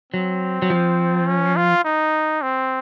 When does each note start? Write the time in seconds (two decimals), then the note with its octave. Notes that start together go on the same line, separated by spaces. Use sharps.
0.13 F#3 C4
0.62 F#3
0.70 F3
1.27 C#4
1.57 F4
1.85 D#4
2.42 C4